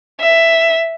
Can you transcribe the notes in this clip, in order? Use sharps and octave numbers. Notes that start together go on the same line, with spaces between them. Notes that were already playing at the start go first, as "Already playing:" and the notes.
E5